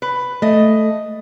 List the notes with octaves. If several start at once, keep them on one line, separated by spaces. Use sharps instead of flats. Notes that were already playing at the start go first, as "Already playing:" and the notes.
B4
A3 D#5